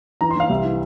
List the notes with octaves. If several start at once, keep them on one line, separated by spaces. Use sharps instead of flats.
E3 A#5
C6
E3 F5
C2 E5
E3